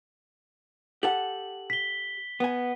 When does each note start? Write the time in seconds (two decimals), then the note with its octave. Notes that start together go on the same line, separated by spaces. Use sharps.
1.03 G4 A4 F#5 F#7
1.70 B6 G7
2.40 B3 G#5